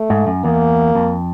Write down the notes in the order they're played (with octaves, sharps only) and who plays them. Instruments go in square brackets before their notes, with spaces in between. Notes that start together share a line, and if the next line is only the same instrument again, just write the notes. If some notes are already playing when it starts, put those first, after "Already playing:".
Already playing: [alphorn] A3
[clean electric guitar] G#2
F#2
[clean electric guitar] E2 [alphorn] A#3
[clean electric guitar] F2